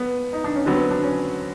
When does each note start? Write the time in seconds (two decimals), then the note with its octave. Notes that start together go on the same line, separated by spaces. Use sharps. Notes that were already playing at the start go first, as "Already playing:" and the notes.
Already playing: B3
0.33 D#4
0.44 D4
0.55 C#4
0.66 D3 F#3 B3 C4
0.79 C4
0.91 D4
1.03 C#4